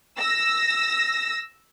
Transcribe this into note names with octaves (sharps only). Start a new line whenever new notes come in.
E6 A#6